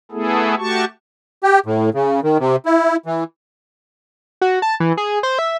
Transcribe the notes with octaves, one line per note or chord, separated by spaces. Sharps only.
A3 B3 E4 G#4 A4
A3 F#4 G4 A5 C#6
G4
A2
C#3
D#3
C3
E4
E3
F#4
A5
E3
G#4
C5
E5